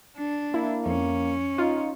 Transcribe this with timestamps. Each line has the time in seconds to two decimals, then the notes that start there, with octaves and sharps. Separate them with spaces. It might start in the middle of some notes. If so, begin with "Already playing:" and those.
0.18 D4
0.54 A#3 E4
0.86 F2 C#4
1.58 D#4 F4